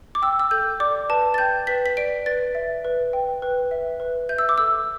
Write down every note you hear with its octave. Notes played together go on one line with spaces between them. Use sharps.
D6
G5 E6
E6
A4 G6
D5 D6
B4 A5
A6
G5 G6
B4 B6
B6
D5 D7
B4 A6
E5
B4
G5
B4
E5
B4
E5 G6
E6
D6
A4 E6